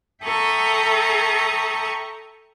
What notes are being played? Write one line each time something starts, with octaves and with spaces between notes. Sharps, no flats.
A4 E5 G5 A#5 C#6 D#6